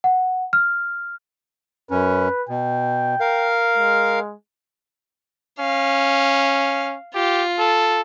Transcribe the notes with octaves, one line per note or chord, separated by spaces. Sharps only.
F#5
F6
F#2 C#4 B4
B2 G5
A#4 F5
G#3
C#4 F5
F4 G4
A4